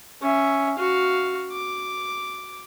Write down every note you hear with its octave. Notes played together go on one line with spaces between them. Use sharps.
C#4 E5
F#4 F5
D6